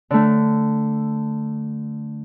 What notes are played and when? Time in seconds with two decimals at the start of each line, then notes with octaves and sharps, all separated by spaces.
0.10 D3 A3